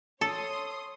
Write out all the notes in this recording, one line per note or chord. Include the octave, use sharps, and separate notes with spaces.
A4 C#5 C6 D#6